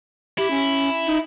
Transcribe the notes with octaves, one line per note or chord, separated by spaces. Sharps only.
E4 G4
C#4
D#4